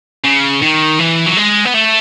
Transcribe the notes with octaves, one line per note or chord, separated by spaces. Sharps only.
C#3
D#3
E3
F#3
G#3
B3
A3